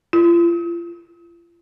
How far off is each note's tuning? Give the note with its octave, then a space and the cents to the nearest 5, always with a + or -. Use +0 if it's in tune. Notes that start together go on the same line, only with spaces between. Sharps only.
F4 -35